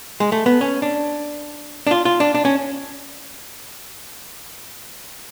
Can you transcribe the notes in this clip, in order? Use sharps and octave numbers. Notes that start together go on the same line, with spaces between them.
G#3
A3
B3
C#4
D4
D4
F4
F4
D4
D4
C#4